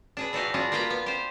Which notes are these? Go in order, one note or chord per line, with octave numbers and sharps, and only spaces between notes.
D4 G#4 B4
E3 D4 D#4 F#4 G4 F5
G3 D4 F4 F#4 G#4
A#3 F4 G4 B4 G5
B3
G4 C5